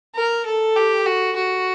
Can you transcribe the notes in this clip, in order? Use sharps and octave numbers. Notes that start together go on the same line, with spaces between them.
A#4
A4
G4
F#4
F#4